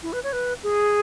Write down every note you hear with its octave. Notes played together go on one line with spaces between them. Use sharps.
E4
B4
C#5
B4
G#4